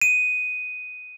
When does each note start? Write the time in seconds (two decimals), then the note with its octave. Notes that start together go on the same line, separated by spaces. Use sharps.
0.02 D#7